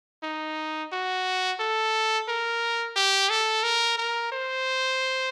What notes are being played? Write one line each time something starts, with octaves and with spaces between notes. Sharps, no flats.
D#4
F#4
A4
A#4
G4
A4
A#4
A#4
C5